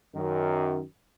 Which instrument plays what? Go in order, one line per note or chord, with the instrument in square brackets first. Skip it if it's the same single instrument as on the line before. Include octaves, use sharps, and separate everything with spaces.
[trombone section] F#2 D#3